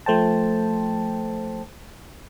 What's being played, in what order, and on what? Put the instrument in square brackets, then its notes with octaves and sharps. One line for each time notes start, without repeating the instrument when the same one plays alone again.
[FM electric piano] F3 A3 C5 G5 A5